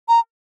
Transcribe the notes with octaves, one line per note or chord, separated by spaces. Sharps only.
A#5